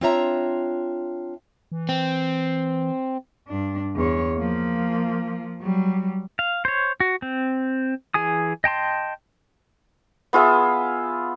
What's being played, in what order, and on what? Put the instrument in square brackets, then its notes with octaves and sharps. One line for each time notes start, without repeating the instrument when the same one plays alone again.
[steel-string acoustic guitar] C4 D4 F4 C#5 E5 A#5
[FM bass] E3
[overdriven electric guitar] C4
[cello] G2 D4
E2 C#5
F3 A#3
F#3 G3
[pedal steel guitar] F5
C5 C#5
F#4
C4
E3 G#4 G#5 D#6
D#5 G5 A5 C6
[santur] B3 F4 G#4 E5